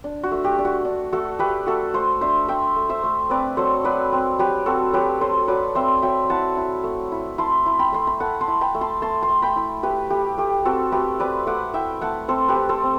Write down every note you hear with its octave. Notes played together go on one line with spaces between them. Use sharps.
D4
F#4
A3
G4
D4
F#4
D4
A3 F#4 A4
A3 G4 B4
A3 F#4 A4
A3 A4 C5
D4 C5 E5
A3 E5 G5
A3
C5 E5
A3
C4 B4 D5
F#3 A4 C5
F#3 B4 D5
C4
F#3 G4 B4
C4 F#4 A4
F#3 G4 B4
F#3 A4 C5
F#3 B4 D5
C4 C5 E5
F#3 E5 G5
E4 F#5 A5
E4
A3
E4
E4 A5 C6
E4
G5 B5
A3 C6
B5
A3 F#5 A5
A5 C6
E4
G5 B5
A3
A5 C6
A3 A5 C6
A5 C6
A3
G5 B5
E4
A3 G4 B4
A3 G4
A3 G4
C4 F#4 A4
A3 G4 B4
C4 B4 D5
A3 D5 F#5
E4 E5 G5
A3 F#5 A5
C4 A4 C5
G4 B4
C4
A4 C5
C4